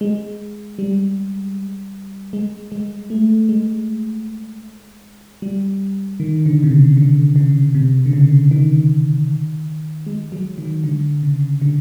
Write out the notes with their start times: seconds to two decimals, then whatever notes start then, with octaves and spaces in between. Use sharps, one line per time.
0.01 G#3
0.79 G3
2.33 G#3
2.72 G#3
3.10 A3
3.49 G#3
5.42 G3
6.20 D#3
6.46 D3
6.64 C3
6.71 C#3
6.97 D3
7.36 C#3
7.75 C3
8.06 D3
8.13 C#3
8.51 D#3
10.06 G#3
10.32 F#3
10.58 D#3
10.84 D3
11.23 C#3
11.62 D3